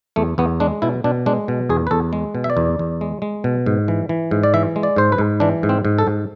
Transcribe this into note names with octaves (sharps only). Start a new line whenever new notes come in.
E2 A3
E2 B3
G#3 D4
B2 E4
B2 D4
G#3 D4
B2
E2 G#4
B4
E2 A4
G#3
B2
E5
D5
E2
E2
G#3
G#3
B2
G#2
E3
E3
G#2
D5
E3 E5
G#3
D5
G#2 C5
B4
G#2
E3 D4
G#2
C4
G#2
A4
G#2